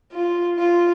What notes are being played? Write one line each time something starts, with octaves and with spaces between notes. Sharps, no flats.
F4
F4